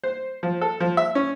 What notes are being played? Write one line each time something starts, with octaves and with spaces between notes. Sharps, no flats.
C5
F3
A4
F3
E5
C#4